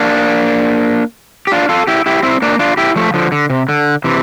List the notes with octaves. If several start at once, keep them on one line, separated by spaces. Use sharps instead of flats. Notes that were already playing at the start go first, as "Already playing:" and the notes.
Already playing: A#3 D4
G4
D4 F4
F4 A4
E4 G4
E4 G4
C4 E4
A#3 D4
D4 F4
E4 G4
F3 A3
D3 F3
D3
C3
D3
C3 E3